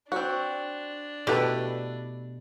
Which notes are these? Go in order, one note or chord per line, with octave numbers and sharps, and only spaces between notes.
C4 D4 F#4
B2 A3 E4 G4 B4